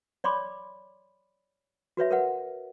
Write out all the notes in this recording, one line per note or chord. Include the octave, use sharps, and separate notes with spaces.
C#5 D5 B5 C6 D6
F#4 B4 C#5 E5
A#4 B4 F#5